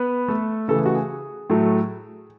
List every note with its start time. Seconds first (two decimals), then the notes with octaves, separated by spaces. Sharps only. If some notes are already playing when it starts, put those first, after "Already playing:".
Already playing: B3 B4
0.28 A3 A4
0.68 C#3 E3 A3 A4
0.77 G#4
0.86 F#4
0.95 G#4
1.50 A2 F#3 A3